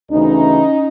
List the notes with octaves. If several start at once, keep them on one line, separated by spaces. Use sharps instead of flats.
D2 C#3 E3 C#4 D#4